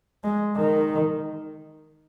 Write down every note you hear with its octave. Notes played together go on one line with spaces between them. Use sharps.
G#3
D#3